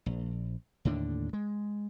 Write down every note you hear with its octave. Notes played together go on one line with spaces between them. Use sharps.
A#1
D#2 A2 D3 D4
G#3